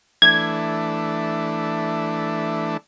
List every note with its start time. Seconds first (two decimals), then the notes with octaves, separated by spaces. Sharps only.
0.22 E3 A3 D4 G#6